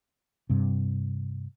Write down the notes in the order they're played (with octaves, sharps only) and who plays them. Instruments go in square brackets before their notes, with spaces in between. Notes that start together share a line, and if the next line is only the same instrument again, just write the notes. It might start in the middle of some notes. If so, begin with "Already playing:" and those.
[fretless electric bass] G2 C3